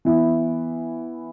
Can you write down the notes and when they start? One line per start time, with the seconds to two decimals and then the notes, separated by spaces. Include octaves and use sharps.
0.05 E3 B3 E4